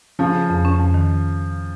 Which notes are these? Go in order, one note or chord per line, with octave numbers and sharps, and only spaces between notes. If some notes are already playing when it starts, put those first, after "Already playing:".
C#3 F3 C#4
G#4
F2
C#4
F2
D#3